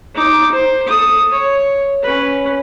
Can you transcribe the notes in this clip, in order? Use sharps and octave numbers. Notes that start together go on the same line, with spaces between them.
D#4 D6
C5
A4 D#6
C#5
C#4 B4